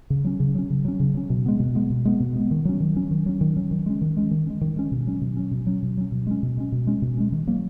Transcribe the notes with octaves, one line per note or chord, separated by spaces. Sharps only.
C#3
F#3 C#4
C#3
F#3 C#4
C#3
F#3 C#4
C#3
F#3 C#4
B2
G#3 B3
B2
G#3 B3
B2
G#3 B3
B2
G#3 B3
D#3
F#3 C#4
D#3
F#3 C#4
D#3
F#3 C#4
D#3
F#3 C#4
D#3
G#3 C#4
D#3
G#3 C#4
D#3
G#3 C#4
D#3
G#3 C#4
B2
F#3 C#4
B2
F#3 C#4
B2
F#3 C#4
B2
F#3 C#4
B2
G#3 C#4
B2
G#3 C#4
B2
G#3 C#4
B2
G#3 C#4
D#3
F#3 A#3